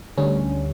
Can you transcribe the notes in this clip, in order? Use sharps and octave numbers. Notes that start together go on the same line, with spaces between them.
D2 D3 G3 C#4